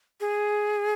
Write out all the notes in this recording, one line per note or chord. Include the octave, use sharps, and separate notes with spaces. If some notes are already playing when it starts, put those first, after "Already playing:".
G#4